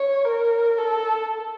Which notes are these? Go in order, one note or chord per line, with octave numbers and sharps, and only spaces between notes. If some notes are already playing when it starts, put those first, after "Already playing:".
Already playing: C#5
A#4
A4